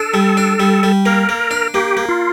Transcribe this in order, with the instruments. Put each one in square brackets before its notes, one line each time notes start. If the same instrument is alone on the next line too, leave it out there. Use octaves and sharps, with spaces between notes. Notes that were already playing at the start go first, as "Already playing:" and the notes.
Already playing: [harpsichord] D4 [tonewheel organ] A4
[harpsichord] G3
D4
G3
G3
[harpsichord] A#3 [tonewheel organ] A#4
[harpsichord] A#3
D4
[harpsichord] A#3 [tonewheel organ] G4
[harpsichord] A#3
[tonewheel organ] F4